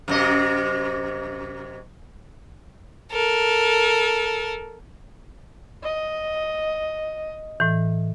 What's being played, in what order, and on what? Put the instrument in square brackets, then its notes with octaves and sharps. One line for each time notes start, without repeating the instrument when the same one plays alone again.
[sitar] F#2 C3 D#5
[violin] A4 A#4
[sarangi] D#5
[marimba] A2 E3